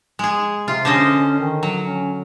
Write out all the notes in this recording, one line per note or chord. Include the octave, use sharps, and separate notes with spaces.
G#3 G#4
C3 F4
D3 C#4 C5 D#5
D#3
F#3
C#4